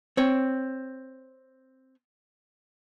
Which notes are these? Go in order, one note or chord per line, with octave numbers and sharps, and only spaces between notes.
C4 C#5